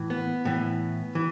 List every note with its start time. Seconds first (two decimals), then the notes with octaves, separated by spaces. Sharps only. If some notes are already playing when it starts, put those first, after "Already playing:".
Already playing: A2 E3
0.10 B3
0.45 A2 E3
1.15 E3